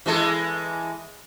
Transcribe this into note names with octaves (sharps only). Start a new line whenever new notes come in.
E3 G#3 A4